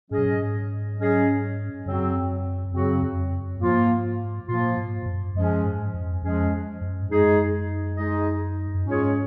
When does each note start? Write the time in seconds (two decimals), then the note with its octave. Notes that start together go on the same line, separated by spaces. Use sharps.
0.11 G#2 F#3 C#4 G#4 D#5
0.18 A#2
0.26 G#2
0.98 F#3 C#4 G#4 D#5
1.86 F#2 C#3 F#3 C4 F#4
2.73 F#2 C#3 F#3 C4 F#4
3.02 F2
3.31 F#2
3.61 G#2 F3 A#3 F4
4.48 A#2 F3 A#3 F4
4.77 G#2
5.03 G#2
5.06 F#2
5.35 F#2 F3 G#3 C#4 G#4
5.64 G#2
5.94 F2
6.23 F2 F3 G#3 C#4 G#4
6.81 F#2
7.02 G#2
7.10 F#2 G#3 D#4 G#4 D#5
7.97 G#3 D#4 G#4 D#5
8.74 F#2
8.86 G#2 G#3 C#4 F4 G#4 C#5